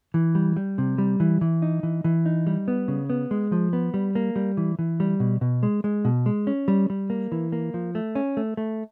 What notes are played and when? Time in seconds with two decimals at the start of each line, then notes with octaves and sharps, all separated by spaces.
0.14 E3
0.35 G3
0.56 G3
0.78 C3
0.98 G3
1.20 E3
1.41 E3
1.62 D#4
1.83 E3
2.04 E3
2.26 D#4
2.47 G3
2.68 B3
2.88 C#3
3.10 B3
3.31 G#3
3.52 F3
3.73 B3
3.94 G3
4.15 A#3
4.36 G3
4.57 E3
4.79 E3
5.00 G3
5.20 B2
5.41 B2
5.63 G#3
5.84 G#3
6.05 B2
6.26 G#3
6.47 C#4
6.68 G3
6.90 G3
7.10 A#3
7.32 E3
7.52 A#3
7.74 F3
7.95 A3
8.15 C#4
8.37 A3
8.57 A3